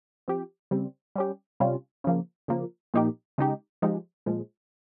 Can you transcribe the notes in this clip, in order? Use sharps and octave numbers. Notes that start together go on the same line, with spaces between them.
F3 C4 G4
C#3 G3 C4
G3 C#4 G4
C3 G3 C#4 F4
C#3 F3 A#3
C#3 F3 A#3
A#2 F3 A#3 D#4 G4
C#3 G#3 D#4 G4
F3 G#3 D#4 G4
A#2 F3 G#3